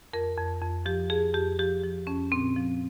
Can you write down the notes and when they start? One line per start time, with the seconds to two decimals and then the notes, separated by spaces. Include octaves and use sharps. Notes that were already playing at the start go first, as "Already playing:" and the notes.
0.13 F2 A#4
0.37 F2
0.62 F2
0.86 F3 G4
1.10 F2 G#4
1.34 F2 G4
1.59 F3 G4
1.83 F3
2.07 F2 C#4
2.31 A#2 C4
2.56 F3